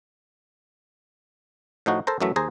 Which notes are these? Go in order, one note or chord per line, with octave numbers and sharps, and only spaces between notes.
A2 F3 D#4 F#4
A4 A#4 C5 A#5
F#2 E3 F#3 A3 E5
D#2 G#4 C5 A#5